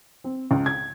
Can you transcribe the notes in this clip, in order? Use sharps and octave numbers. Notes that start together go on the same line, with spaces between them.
C4
C#2
G#6